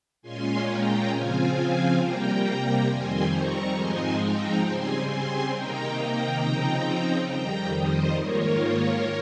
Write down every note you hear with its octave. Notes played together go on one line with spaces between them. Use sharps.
A#2 G#3 C#4 F4 G#5 C6
G5 A#5
C#3 F3 C4 F4 F5 G#5
F5 G#5
C3 G3 A#3 G5 A#5
G5 A#5
F2 D#3 G3 C4 G#5 C6
A#5 C#6
G#2 F3 G#3 C4 D#4 G#5 C6
G5 A#5
C#3 G3 C4 G#5 C6
G#5 C6
C3 D#3 A#3 D#4 G5 A#5
G5 A#5
C#3 F3 C4 D#4
F2 D#3 G3 G5 A#5
C5 D#5
G#2 D#3 A#3 F4 A#4 C#5
A#4 C#5